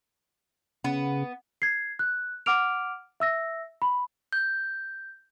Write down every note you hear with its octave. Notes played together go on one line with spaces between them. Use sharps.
C#3 B3
G#6 C7
F#6
F#5 D6 F6 D7 F7
E5 E6 A#6
B5
G6